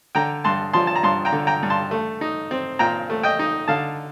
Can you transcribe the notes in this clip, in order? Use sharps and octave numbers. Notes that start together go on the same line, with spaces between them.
D3 G5 A#5
G2 A5 C6
F3 A5 C6
A5
A#5
G2 A5 C6
G5 A#5
D3
G5 A#5
G2
A5 C6
A3
D#4
C4
A#2 G5 A#5
A3
D#5 G5
D#4
D3 F5 A5